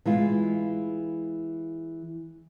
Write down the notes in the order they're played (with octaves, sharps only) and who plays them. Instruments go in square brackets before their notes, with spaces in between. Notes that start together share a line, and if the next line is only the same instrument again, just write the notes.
[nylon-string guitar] E3 G#3 F4